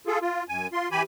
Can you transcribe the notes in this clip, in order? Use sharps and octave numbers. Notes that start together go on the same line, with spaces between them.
F4 G#4 A4
F4
F#2 G#5
F4 C6
E3 G4 G#5 B5